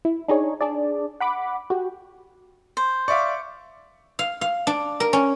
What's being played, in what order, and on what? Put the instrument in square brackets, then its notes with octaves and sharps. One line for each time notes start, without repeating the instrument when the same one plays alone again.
[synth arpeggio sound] E4
D4 D#4 G#4 C#5
D4 G#4 D5
F#5 B5 D6
F#4 G4
[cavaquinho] C5
[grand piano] D5 E5 F5 [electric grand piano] C#6 D6
[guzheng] F5
F5
D4
A#4
C#4